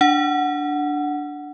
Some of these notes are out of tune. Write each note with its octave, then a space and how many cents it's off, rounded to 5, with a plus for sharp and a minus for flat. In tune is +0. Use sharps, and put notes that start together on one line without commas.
D4 +0 F#5 +0